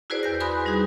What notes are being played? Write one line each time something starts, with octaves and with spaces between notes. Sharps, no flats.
E4 F#4 G#4 B4 C5 D5
E2 G6 A#6
B4 G#5 B5 C6 D#6 F#6
G3 D#4 F#4 G#4